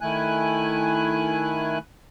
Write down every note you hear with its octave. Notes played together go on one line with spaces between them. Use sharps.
D#3 A3 E4 G#5 F#6